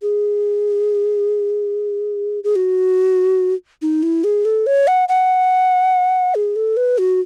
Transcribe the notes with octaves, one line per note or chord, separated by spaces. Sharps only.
G#4
G#4
F#4
D#4
E4
G#4
A4
C#5
F#5
F#5
G#4
A4
B4
F#4